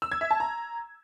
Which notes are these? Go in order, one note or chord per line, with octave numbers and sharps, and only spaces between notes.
E6
G#6
E5
A5
A#5